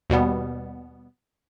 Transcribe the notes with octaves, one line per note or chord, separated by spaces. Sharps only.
D#2 B2 G3 B3